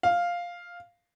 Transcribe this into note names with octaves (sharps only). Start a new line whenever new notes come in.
F5